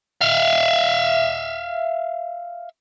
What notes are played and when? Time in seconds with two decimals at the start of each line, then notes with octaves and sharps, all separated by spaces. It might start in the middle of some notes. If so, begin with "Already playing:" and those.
0.21 E5 F5